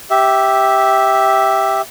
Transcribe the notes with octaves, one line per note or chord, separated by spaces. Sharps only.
G4 E5